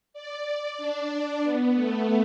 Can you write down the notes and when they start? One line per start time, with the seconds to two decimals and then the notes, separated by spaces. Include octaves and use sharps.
0.14 D5
0.78 D4
1.43 B3
1.75 A3